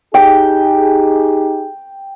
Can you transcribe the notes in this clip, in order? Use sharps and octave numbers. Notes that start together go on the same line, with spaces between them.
D#4 G4 G#4 G5